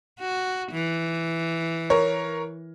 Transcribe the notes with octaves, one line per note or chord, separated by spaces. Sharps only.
F#4
E3
A#4 C#5